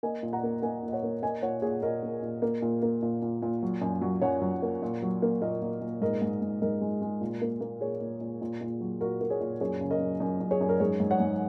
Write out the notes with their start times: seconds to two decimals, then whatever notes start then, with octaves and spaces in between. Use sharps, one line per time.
0.03 A#3 D#5 G#5
0.23 A#2
0.33 F#5 A#5
0.43 A#3
0.62 A#3 D#5 G#5
0.83 A#2
0.88 D#5
0.92 C#5 F#5
1.03 A#3
1.23 A#3 D#5 G#5
1.42 A#2 C#5 F#5
1.62 A#2 G#4 C#5
1.82 A#2 A#4 D#5
2.03 A#3
2.23 A#2
2.42 A#3
2.62 A#2
2.83 A#3
3.02 A#2
3.22 A#2
3.42 A#2
3.63 F#3
3.82 F#2
4.02 F#3
4.21 F#2 C#5 F#5
4.42 F#3
4.62 A#3
4.82 A#2
5.02 F#3
5.22 A#3
5.42 A#2 A#4 D#5
5.62 A#2
5.81 A#2
6.02 G#2 A#4 D#5
6.22 G#2
6.42 G#2
6.62 G#2 A#4 D#5
6.81 G#3
7.02 G#3
7.21 A#2
7.42 A#3
7.61 A#3
7.81 A#2 G#4 C#5
8.01 A#2
8.21 A#2
8.41 A#2
8.61 A#2
8.81 F#3
9.01 A#2 F#4 A#4
9.21 A#3
9.30 G#4 C#5
9.41 A#2
9.61 F#2 G#4 C#5
9.81 C#3
9.91 A#4 D#5
10.00 F#2
10.20 F#2
10.40 F#2
10.51 G#4 C#5
10.61 F#2
10.69 A#4
10.80 G#2 G#4 C#5
11.00 G#2
11.11 C#5 F#5
11.20 G#2